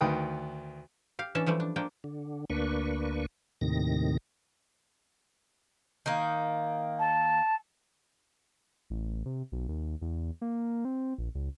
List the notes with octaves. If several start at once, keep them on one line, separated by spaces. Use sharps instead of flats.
D2 D#3 B4 G5 D#6
G4 F5
E3 C#4 D4 E5 A5
E3 F3 G3 A3
D4
F3 A#3 D4 G5
D3
D2 A#3 D4 B4 C#6
D#2 A2 C3 D#3 A#6
D#3 A#3
A5
A1
C3
B1
D#2
E2
A#3
C4
A#1
C#2